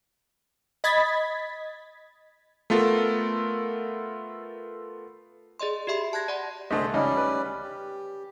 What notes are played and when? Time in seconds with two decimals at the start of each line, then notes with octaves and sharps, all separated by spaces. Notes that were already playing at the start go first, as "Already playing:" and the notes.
0.84 D#5 B5 G#6 A6 B6
2.70 A3 B3 F4 A4 A#4
5.60 G#4 D5 D#5 C6
5.87 F#4 G4 E5 B5 C6
6.13 A5 F#6 G#6 A#6
6.28 D5 F#5 A5 B5 C6
6.71 C2 D3 A3 G#4 C5 D#5
6.94 C#2 G3 C#4 D#4 D5 D#5
7.17 B4
7.62 G4